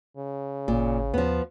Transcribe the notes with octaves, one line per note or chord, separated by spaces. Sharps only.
C#3
G#1 A#2
D#2 F3 B3